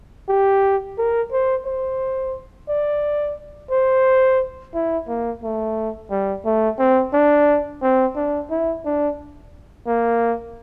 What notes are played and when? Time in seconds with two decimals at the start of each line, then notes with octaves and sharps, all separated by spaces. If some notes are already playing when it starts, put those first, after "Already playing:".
0.29 G4
0.98 A#4
1.32 C5
1.66 C5
2.69 D5
3.71 C5
4.74 E4
5.08 A#3
5.43 A3
6.11 G3
6.45 A3
6.79 C4
7.14 D4
7.82 C4
8.16 D4
8.51 E4
8.85 D4
9.87 A#3